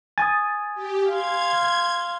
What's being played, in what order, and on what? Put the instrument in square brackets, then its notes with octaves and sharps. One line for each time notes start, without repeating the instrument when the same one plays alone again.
[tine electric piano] G#5 [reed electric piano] D#6 A6
[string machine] G4
[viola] F5 C6 [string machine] G#6